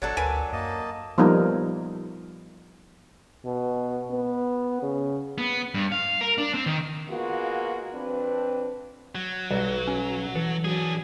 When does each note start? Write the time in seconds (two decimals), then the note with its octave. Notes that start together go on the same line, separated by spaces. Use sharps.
0.02 G#1 F#3 D4 A4
0.17 D2 A#4 B4 G#5
0.53 F#2 A#3 D#5 A5
1.18 F3 G3 A#3 B3 D#4 A#4
3.45 B2
4.11 B3
4.82 C#3
5.38 B3
5.74 G2
5.92 F5
6.21 A#4
6.38 D4
6.54 C4
6.66 D#3
7.09 G#3 A#3 B3 F4 F#4
7.93 F2 C4 D4 B4
9.15 F#3
9.51 B1 G3 F#4 A5
9.87 C#4
10.35 E3 A4
10.65 F#3 D4 G#4